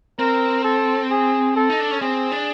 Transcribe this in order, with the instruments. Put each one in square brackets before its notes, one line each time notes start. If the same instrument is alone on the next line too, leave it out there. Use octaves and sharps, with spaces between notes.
[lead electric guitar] C4 [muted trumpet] A#4
[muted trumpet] A4
G#4
A4
[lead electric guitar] D#4
D4
C#4
[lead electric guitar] C4 [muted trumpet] G#4
[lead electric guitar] D4